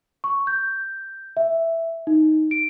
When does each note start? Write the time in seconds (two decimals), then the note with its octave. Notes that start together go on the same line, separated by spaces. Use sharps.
0.24 C#6
0.47 G6
1.37 E5
2.07 D#4
2.51 D7